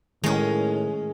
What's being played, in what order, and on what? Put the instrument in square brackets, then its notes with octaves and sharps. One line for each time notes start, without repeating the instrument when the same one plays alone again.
[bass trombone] A2 [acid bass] D#3 [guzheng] G#3 C#4